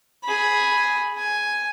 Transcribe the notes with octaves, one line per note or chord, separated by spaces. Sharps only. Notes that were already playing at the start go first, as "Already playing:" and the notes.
G#4 B5
G#5